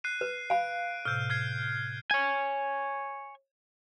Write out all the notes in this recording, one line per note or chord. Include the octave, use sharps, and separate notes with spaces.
F#6 C7 D#7
B4
F5 B5 D7
A2 C3 E6 F6 G6
F6 G#6 C7
C#5 G#5